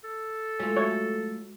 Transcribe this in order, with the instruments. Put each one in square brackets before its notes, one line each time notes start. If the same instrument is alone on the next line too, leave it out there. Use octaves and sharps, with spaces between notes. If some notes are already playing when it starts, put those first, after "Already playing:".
[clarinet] A4
[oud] F#3 A3 F4 [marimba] G#3
[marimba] F#4 E5 [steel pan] C#5